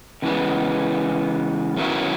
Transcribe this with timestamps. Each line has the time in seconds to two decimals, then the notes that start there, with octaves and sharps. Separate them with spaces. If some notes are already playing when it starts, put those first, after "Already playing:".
0.22 C#3 E3 G#3 B3
1.76 F#2 D#3 F#3 B3 E4